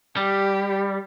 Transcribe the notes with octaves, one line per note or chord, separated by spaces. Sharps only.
G3 G4